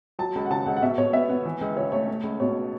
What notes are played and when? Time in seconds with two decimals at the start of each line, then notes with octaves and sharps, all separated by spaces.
0.19 F#3 A5
0.35 C#2
0.46 F#5
0.50 C#3 A5
0.66 C#2 F#5
0.77 F#5
0.82 B2 E5
0.98 B2 C#5
1.13 B3 E5
1.29 B3
1.45 E3
1.61 C#2
1.76 C#3 C#5
1.92 A3 C#5
2.07 A3
2.24 C#2
2.40 B2 C#5